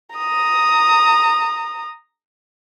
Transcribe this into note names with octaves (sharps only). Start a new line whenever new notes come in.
A#5 D#6